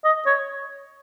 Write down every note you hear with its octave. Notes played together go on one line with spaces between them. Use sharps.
D#5
C#5